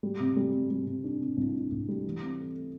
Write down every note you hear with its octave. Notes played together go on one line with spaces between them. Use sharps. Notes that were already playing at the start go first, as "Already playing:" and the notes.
G3
C3
G3
C3
G3
C3
D4
C3
C2
D4
C2
G3
E3
C4
A3
A3